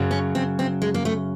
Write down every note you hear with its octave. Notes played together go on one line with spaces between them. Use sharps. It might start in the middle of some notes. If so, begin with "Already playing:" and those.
Already playing: F#2 C#3 F#3
C#4
C4
C4
G#3
A#3
A3